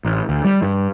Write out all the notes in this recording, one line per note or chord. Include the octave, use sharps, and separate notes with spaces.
A1
D2
G3
G2